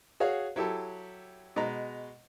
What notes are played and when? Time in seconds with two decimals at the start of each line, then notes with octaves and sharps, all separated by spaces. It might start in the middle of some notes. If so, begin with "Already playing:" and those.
0.20 F#4 G#4 C#5 F5
0.56 F#3 E4 G4 A4
1.56 B2 G#3 A#5